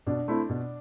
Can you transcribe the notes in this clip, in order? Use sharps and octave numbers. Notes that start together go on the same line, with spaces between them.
B2 D4
A3 C4 E4
B2